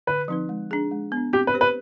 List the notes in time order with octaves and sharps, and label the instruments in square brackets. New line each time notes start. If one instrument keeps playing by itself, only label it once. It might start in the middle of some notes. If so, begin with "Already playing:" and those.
[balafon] D3 [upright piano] B4
[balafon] F3 C4 D#4 B4
G#3
D4 G#4
G#3
B3
D4
[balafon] C4 [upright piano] G4
[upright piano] B4
[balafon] G4 C5
[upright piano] B4